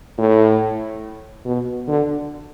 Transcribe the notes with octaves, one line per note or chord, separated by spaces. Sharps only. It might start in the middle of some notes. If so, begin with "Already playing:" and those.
A2
B2
D3